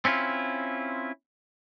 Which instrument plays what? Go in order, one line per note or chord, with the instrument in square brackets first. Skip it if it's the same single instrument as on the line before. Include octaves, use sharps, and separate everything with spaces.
[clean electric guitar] C4 C#4 E4 F4